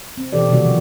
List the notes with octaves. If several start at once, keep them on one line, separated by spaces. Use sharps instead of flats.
C4
B2 E3 G4 A4 D5
C3 D#3 G3 A#3 F#4 D5
F3